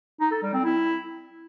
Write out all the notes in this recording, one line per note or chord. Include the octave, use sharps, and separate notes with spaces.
D#4
A4
G3
C4
E4